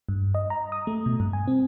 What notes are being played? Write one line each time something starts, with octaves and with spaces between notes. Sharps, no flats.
G2
D#5
A#5
D#6
A3
B2
G2
G#5
C4